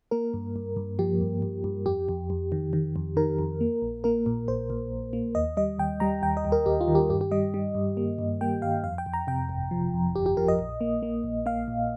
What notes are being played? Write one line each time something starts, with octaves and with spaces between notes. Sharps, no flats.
A#3 A#4
G2
G2
G2
F3 G4
G2
G2
G2
F2 G4
F2
F2
D#3
D#3
F2
D#3 A#4
F2
A#3
A#1
A#3 A#4
A#2
A#1 C5
A#2
A#1
A#3
D#2 D#5
G3 D#5
D#2 G5
G3 A#5
D#2 G5
D#5
D#2
A#4
D#2 G4
F4
D#3
G4
G2 G4
G4
G3 D#5
G3
G2
A#3
G2
A#3 G5
G2 F5
F2 F5
G5
F2
A#5
C3 G5
G1
F3
F2
G1 G4
G4
F3 A#4
D#5
A#1
A#3
A#3
A#1
A#3 F5
A#2